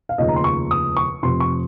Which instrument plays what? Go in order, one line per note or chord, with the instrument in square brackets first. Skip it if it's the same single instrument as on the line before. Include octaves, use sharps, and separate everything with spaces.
[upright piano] F5
F1 D#2 C#3 F3 D#5
A#5
C6
C#6
D#6
C#6
F1 F2 C3 C6
C#6